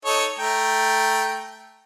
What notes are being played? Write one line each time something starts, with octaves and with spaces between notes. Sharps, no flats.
D#4 A4 C#5
A3 G5 A#5